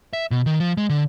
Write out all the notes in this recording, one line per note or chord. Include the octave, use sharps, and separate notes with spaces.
E5
B2
D#3
F3
G#3
D3